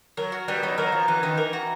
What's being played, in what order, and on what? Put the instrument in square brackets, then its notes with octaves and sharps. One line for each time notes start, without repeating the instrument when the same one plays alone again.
[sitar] F#3 [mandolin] A#4
[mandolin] F#4
[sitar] G3 [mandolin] B3
[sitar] F#3 [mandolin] D#4
[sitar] F#3 [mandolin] A#4
[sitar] F3 [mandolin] F#4
[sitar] E3 [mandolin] B3
[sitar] D#3 [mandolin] D#4
[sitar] E3 [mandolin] A#4
[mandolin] F#4